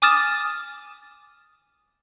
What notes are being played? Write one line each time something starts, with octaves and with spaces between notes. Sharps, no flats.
G#5 D6 D#6 F6 A6 E7